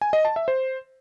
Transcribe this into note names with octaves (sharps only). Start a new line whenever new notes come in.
G#5
D#5
A5
E5
C5